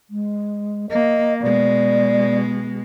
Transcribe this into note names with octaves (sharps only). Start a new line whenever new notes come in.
G#3
A#3 D#5
B2 G#3 D5